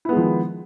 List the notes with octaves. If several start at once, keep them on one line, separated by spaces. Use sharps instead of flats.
D#3 F3 G#3 B3 E4